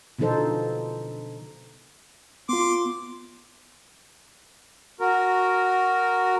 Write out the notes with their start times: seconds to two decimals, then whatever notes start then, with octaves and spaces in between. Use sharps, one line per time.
0.19 B2 D3 F3 D#4 A4 C5
2.49 B3 F4 C6 D6
5.00 F#4 A#4